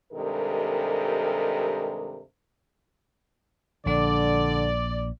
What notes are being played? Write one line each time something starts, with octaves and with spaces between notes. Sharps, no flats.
G2 C3 D#3 G#3 A4 A#4
A#1 D3 D5